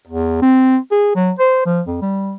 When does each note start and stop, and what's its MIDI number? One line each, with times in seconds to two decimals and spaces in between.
0.07 0.40 40
0.42 0.77 60
0.92 1.12 68
1.16 1.32 54
1.39 1.61 72
1.66 1.81 53
1.87 1.97 41
2.02 2.37 55